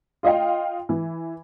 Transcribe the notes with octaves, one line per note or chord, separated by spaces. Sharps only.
F4 D#5 F5 G5
E3